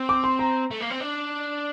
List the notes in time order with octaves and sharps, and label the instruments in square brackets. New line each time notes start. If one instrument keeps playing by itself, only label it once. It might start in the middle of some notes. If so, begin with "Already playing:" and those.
Already playing: [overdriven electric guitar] C4
[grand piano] D6
C6
A#5
[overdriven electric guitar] A3
A#3
C4
D4